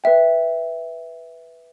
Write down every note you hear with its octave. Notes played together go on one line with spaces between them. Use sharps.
B4 E5 G5